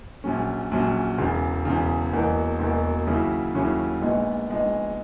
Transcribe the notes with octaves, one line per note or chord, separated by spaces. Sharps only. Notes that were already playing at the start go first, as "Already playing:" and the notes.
A#1 A#2 F#3 C#4
A#1 A#2 F#3 C#4
E1 E2 C#3
E1 E2 C#3
E1 E2 B2 A#3
E1 E2 B2 A#3
D#2 C#3 F#3 C#4 E4
D#2 C#3 F#3 C#4 E4
A#1 A#2 G#3 B3 D#4
A#1 A#2 G#3 B3 D#4